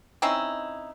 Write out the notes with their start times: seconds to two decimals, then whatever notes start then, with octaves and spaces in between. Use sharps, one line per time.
0.22 C4 C#4 D#4 E4